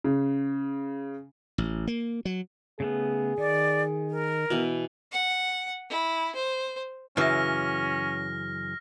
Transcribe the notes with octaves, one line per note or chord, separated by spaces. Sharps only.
C#3
A1
A#3
F#3
C#3 A3 B3 G#4
D#3 D5
A#4
B2 E3
F#5
E4
C5
F#2 C#3 E3 C#4 F6 A#6